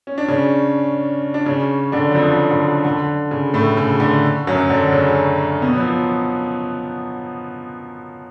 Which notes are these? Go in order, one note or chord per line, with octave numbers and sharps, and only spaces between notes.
C#4
D4
C#3 C#4
D4
C#3 C#4
D3 D4
F#3
F2 F3
D3
D3
C#3
A2 A3
C#3
D3
F#2 F#3
D3 D4
C#3 C#4
B2 B3
F#3
F3